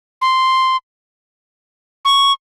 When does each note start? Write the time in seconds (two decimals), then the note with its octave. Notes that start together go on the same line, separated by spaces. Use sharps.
0.22 C6
2.05 C#6